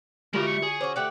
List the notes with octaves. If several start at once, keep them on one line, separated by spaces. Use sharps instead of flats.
D3 G3 G#3 F4 F#4 A#4 E5
C#6
G#4
C#4 F#4 C5 D6
A3 G4 D5 F#5